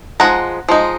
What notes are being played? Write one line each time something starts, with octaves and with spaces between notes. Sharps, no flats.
F3 G#3 D#4 F#5 A#5
F3 G#3 D#4